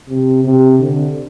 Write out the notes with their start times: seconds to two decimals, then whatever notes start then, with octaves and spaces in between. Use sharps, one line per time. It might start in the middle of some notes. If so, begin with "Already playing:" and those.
0.08 C3
0.44 C3
0.79 D3